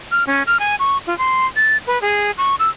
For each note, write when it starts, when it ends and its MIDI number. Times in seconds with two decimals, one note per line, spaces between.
0.11 0.24 89
0.27 0.43 61
0.47 0.57 89
0.60 0.75 80
0.80 0.98 85
1.07 1.17 65
1.18 1.46 84
1.56 1.77 93
1.87 2.01 71
2.02 2.31 68
2.38 2.55 85
2.59 2.69 88